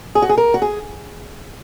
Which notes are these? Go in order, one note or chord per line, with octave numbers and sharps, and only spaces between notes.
G#4
F#4
G#4
A#4
F#4
G#4